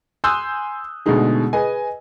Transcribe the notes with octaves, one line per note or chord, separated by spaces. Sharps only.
G#5 C6 D#6 E6 F#6 G6
B2 D3 G#3 A3 D#4 G#4
G#4 B4 D#5 G#5